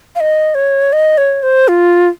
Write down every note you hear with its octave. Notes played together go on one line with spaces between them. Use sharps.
F5
D#5
C#5
D#5
C#5
C5
F4